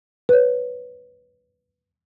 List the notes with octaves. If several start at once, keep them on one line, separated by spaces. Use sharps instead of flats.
B4 C#5